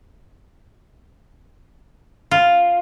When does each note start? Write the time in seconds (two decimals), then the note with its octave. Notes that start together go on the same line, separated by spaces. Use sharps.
2.31 F4